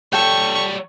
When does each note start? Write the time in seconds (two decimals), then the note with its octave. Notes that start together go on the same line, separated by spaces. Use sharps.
0.13 G3 A4 C#5 G5 C#6